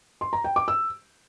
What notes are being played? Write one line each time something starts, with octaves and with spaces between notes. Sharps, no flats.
C6
A#5
G5
D6
E6